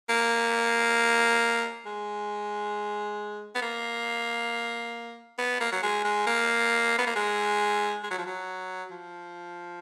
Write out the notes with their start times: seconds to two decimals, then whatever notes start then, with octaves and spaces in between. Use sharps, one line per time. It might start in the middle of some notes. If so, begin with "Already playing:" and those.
0.09 A#3
1.86 G#3
3.55 B3
3.62 A#3
5.38 B3
5.60 A#3
5.72 F#3
5.83 G#3
6.04 G#3
6.27 A#3
6.98 B3
7.07 A#3
7.15 G#3
8.03 G#3
8.11 F#3
8.18 F3
8.26 F#3
8.91 F3